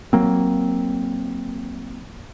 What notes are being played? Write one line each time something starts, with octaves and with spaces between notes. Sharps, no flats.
F#3 A#3 C4